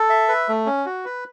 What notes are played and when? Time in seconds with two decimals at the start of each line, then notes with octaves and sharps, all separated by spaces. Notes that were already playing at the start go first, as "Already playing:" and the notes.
Already playing: A4
0.10 E5
0.28 B4
0.49 A3
0.66 C#4
0.86 F#4
1.05 B4